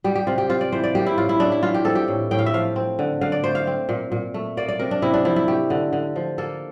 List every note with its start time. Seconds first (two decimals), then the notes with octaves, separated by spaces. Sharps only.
0.04 G3 G4
0.15 G4
0.27 C3 F4
0.38 G4
0.49 C4 F4
0.61 D5
0.72 E3 C5
0.84 D5
0.95 A#3 G4
1.07 E4
1.18 A2 F4
1.29 E4
1.40 A2 D4
1.52 E4
1.63 E3 F4
1.74 G4
1.85 C4 A4
1.95 G4
2.08 A2
2.31 A2 G5
2.39 F5
2.46 E5
2.54 F3 F5
2.76 C4
2.99 D3
3.21 D3 F5
3.32 D5
3.44 A3 C5
3.55 F5
3.67 C4
3.89 A#2
4.12 A#2
4.34 A3
4.57 A#3 D5
4.68 D5
4.79 C3 A#4
4.91 D4
5.02 C3 E4
5.14 D4
5.25 F3 E4
5.36 E4
5.48 A3 G4
5.70 D3
5.93 D3
6.16 F3
6.38 A#3 A4